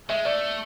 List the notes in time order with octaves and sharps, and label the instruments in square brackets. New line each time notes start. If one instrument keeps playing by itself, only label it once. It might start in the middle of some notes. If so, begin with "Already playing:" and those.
[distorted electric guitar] G#3 [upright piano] E5
[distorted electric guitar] A3 [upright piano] D5